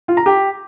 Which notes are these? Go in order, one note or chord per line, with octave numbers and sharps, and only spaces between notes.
F4
A#5
G4